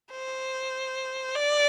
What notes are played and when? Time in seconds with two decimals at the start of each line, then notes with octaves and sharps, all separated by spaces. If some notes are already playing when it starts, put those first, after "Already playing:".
0.12 C5
1.35 D5